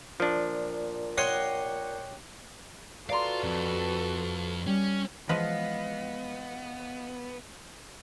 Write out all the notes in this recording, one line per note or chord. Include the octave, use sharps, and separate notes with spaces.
A#2 F3 D4
G4 C#5 D#5 F#5 C6
F4 F#4 A4 B4 D5 F5 A#5 C6
F2
G3 C#4
E3 F3 G#3 B3 B4 D#5 F5